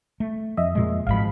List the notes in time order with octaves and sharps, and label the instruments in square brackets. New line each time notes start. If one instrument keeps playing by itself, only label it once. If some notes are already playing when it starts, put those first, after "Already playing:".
[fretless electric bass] A3
[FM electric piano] F2 D#5 E5
[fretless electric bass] A#2 G#3
[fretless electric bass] G#1 G#2 F3 [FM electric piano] F5 B5